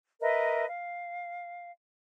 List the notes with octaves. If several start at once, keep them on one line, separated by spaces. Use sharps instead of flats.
A#4 B4 D#5 E5
F5